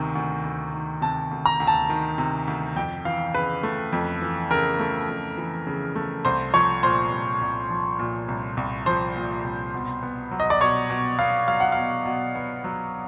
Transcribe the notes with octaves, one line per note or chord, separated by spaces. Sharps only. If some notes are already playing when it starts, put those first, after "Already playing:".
Already playing: D2 C3 D#3
D2
D2
D#3
C3 A5
D2
A#5
D2
A5
D#3
C3
D2
F2 G5
E3 F5
C#3 B4
A3
F2
E3
C#3 A#4
A3
F2
E3
C#3
A3
C2 C5
F3 C#5
A#2 C5
C2
C2
F3
A#2
C2
C2
F3 C5
A#2
C2
B2
B3
F#3
D#5
D5
B2 C#5
B2
B3 F5
F#3 F5
F#5
B2 F5
B2
B3
F#3